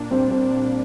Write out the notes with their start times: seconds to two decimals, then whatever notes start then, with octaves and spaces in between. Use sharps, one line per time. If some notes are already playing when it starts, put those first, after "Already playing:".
Already playing: A#2 A#3 D4
0.11 G3 C4
0.31 A#2 C4
0.51 D4